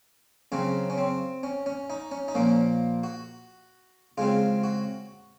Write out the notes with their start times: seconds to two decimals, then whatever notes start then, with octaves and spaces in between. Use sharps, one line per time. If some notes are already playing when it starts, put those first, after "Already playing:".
0.52 C#3 F#3 C4 C#4
0.90 C#4
0.98 C4
1.43 C#4
1.66 C#4
1.90 D#4
2.11 C#4
2.28 D#4
2.35 A#2 F3 A#3 C#4
3.03 F#4
4.18 C#3 G#3 C4 F4
4.64 F#4